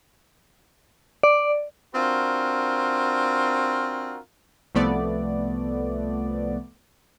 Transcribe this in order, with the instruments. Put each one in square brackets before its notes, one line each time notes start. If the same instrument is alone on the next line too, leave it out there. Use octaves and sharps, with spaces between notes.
[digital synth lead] D5
[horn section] C4 D4 F4 F#4 A#4
[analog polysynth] C2 F3 A3 B3 D5